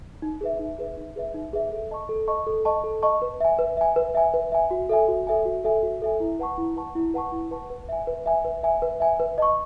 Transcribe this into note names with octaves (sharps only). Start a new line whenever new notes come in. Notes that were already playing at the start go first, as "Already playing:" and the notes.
D#4
G#4 B4 E5
D#4
G#4 B4 E5
D#4
G#4 B4 E5
D#4
G#4 B4 E5
A4
D#5 A5 C#6
A4
D#5 A5 C#6
A4
D#5 A5 C#6
A4
D#5 A5 C#6
B4
E5 G#5
B4
E5 G#5
B4
E5 G#5
B4
E5 G#5
F#4
A4 E5 G#5
F#4
A4 E5 G#5
F#4
A4 E5 G#5
F#4
A4 E5 G#5
E4
B4 F#5 A5 C#6
E4
B4 F#5 A5 C#6
E4
B4 F#5 A5 C#6
E4
B4 F#5 A5 C#6
B4
E5 G#5
B4
E5 G#5
B4
E5 G#5
B4
E5 G#5
B4
D#5 A5 C#6